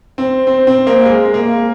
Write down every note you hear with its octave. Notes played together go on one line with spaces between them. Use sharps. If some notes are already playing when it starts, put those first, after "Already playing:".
C4
C4
C4
A#3
G#3
A#3